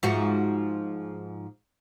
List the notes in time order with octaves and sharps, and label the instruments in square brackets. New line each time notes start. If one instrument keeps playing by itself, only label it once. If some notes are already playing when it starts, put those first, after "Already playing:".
[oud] G#2 F3 F#4